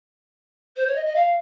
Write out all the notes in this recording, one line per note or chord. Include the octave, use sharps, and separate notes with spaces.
C5
C#5
D#5
D#5
F5